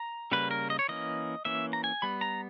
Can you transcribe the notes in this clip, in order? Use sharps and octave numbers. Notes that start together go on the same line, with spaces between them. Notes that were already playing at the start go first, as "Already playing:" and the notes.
Already playing: A#5
C#3 G3 A#3 B4
A#4
D#5
C#5
E3 A#3 C#4 D#5
E3 A#3 C#4 E5
A#5
G#5
G3 B3 B5
A#5